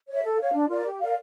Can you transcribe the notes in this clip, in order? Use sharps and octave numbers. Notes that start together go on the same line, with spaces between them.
C#5 E5
A4
C#5 F5
D4
F4 A#4 D5
G4
A#4 D5 F5